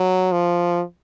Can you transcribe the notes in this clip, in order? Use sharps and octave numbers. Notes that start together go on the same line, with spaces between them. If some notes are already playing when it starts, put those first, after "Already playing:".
Already playing: F#3
F3